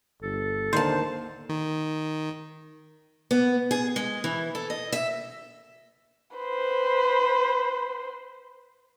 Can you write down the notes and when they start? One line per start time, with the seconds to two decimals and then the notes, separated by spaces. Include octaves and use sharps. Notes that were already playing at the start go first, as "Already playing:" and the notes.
0.22 G1 A4
0.73 D#2 D3 C5 A5
1.49 D#3
3.31 B3
3.71 G#4
3.96 G#3
4.24 E3
4.55 A4
4.70 D#5
4.92 E5
6.37 B4 C5